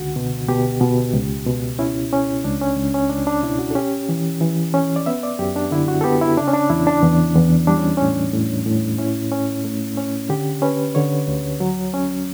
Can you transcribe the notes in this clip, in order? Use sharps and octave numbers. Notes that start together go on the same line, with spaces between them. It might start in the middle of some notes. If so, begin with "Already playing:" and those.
Already playing: C#2 D3 F#4
B2
B2 G4
B2
C#2
B2
C#4 E4
C#4
C#2 D4
C#4
C#2
C#4
C#2 D4
D4
B2 E4
F#4
A4
C#4 G4
E3
E3
C#4
D5
B3 E5
D5
F#2 G4
D4
D3 E4
F#4
A4
B3 G4
E4
C#3 D4
C#4
D4
E2 E4
D4
E2
E2
G3 D4
C#4
A2 C#4
A2
A2
C#4 E4
C#4
A3
C#4
D3 G4
C#4 B4
D3 C#5
D2
F#3
C#4